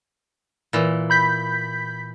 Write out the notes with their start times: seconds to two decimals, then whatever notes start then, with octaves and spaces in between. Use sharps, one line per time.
0.73 A#2 E3
1.10 B5 G6 B6